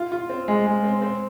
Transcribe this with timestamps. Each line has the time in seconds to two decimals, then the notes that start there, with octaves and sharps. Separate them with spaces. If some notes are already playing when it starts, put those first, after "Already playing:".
Already playing: F4
0.12 F4
0.29 C4
0.48 G#3
0.66 G#3
0.84 C4
1.02 C4